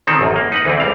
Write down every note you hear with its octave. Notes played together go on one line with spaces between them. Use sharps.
D#3 F3 C4 A4
A1 F#2
A#3
D#4 B4 F#5
D2 E3 C4
C#2 G3 F5